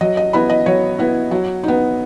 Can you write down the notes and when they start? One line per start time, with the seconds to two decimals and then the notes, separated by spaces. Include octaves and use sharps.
0.01 F#3 D#5
0.17 D#5
0.33 B3 E4 B5
0.50 D#5
0.66 F#3 C#5
0.99 B3 E4
1.31 F#3
1.63 B3 D#4